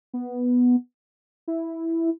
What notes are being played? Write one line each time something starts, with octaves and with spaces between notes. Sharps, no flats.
B3
E4